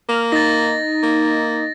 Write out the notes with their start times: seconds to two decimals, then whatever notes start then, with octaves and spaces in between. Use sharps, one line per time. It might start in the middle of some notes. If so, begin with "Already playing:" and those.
0.09 A#3 F6
0.32 D#4 A6 A#6
1.03 A#3